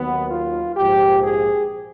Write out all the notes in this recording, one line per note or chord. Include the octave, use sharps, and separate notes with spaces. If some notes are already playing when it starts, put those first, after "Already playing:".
Already playing: D#2 D#3 F#3 B3
F4
A#1 G#2 F3 G4
G#4